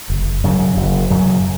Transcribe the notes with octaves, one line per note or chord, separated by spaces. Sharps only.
F#1
F#2 C#3 F#3
F#1
F#2 C#3 F#3